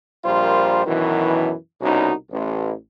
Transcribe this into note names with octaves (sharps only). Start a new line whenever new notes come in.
A#1 G3 F4 A#4 C5
F#2 B2 D#3 E3
C2 B2 C#4 D#4 F#4
A1